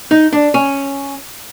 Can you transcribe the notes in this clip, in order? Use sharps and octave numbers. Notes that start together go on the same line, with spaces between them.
D#4
D4
C#4